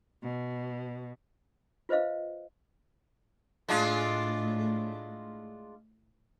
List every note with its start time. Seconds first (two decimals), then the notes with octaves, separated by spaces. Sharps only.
0.21 B2
1.89 F4 B4 C5 D#5 F5
3.69 A2 G#3 D4 F4